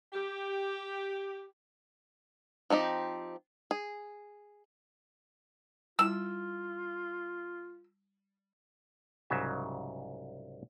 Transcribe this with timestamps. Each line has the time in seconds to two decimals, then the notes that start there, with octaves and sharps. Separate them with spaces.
0.13 G4
2.70 F3 C4 D#4 G4
3.71 G#4
5.99 G3 E4 F4 E6
9.30 C2 G#2 C#3 F#3 E5